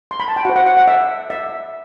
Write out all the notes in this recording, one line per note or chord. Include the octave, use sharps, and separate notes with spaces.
C6
B5
A5
G5
F#4 C5 F#5
F#5
F#5
F#5
E5
E5